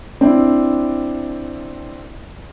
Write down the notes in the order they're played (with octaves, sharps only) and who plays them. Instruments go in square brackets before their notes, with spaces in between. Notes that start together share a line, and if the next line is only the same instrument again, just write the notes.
[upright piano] C4 D4 E4